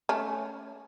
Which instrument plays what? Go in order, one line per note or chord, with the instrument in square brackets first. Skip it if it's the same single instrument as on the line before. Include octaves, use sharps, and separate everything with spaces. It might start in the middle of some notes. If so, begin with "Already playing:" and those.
[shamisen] A3 C#4